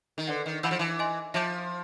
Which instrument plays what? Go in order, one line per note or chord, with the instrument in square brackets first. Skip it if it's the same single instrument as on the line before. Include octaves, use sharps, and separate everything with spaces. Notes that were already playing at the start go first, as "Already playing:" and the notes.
[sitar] D#3
[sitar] D3 [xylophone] B4 D5 F#5
[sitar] D#3
[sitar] E3 [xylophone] F#5 B5 E6 G6
[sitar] F3
E3
[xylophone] D#5 G#5 C6
[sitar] F3 [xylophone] E5 A5 D6 G6